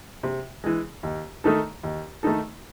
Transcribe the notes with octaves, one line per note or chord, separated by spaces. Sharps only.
C3
E3 G#3
D#2
D#3 A3 D#4 A4
D#2
D#3 A3 D#4 A4